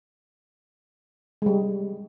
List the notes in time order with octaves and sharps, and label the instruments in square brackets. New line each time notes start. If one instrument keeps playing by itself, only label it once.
[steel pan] G3 G#3